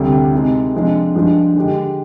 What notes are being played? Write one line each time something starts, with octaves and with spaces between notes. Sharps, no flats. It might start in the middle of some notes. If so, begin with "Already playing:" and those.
Already playing: D2 C3 G3 D4 G4
C3 D#3 G#3
C3 F3 G#3 D4
G2 F3 G#3 D4
D3 G#3 D4 G4